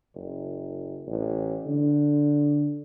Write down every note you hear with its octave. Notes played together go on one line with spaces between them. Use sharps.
F#1
A1
D3